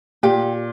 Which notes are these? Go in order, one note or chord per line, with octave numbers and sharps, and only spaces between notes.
A#2 G4